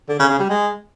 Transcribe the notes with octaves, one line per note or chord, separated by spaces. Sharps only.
D3
C#3
C#3
G3
G#3